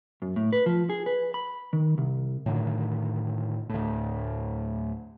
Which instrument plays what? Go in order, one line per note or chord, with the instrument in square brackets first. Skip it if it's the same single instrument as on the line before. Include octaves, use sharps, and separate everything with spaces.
[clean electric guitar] F#2
A2
B4
F3
G#4
B4
B5
D#3
C2
[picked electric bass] A2 D3 D#3
D2 A2